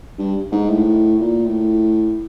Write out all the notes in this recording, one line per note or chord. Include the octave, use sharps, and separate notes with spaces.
G2
G#2
A2
A#2
A2